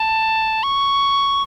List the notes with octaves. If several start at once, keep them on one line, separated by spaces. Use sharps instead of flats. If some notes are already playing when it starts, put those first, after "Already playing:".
Already playing: A5
C#6